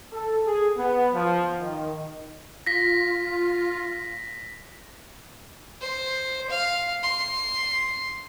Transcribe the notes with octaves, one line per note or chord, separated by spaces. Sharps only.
A4
G#4
B3
F3
D#3
F4 A#6 B6
C5
F5
C6